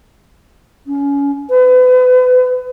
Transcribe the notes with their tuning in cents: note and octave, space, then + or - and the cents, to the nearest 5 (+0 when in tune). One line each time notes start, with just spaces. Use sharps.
C#4 +25
B4 +35